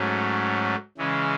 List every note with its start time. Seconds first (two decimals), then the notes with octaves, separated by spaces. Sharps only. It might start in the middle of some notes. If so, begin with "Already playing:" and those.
Already playing: G#2 F#3 A3 C#4
0.97 C#3 E3 G#3 C#4